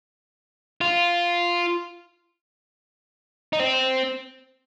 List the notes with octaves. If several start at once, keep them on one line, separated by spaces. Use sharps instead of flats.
F4
D#4
C4